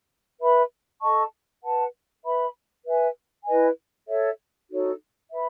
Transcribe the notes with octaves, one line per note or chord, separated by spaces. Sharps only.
B4 E5 B5
A4 D#5 A5 C#6
B4 F#5 A5
B4 E5 B5
B4 E5 G#5
E4 B4 D#5 G#5
A4 C#5 E5
D#4 F#4 A4 C#5
B4 E5 B5